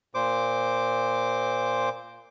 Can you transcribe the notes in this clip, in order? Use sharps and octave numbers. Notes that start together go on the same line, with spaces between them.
A#2 C5 D6